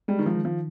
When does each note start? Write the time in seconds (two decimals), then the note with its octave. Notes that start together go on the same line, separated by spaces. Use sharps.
0.08 G3 G#3
0.19 D#3
0.26 F3
0.35 D#3
0.45 F3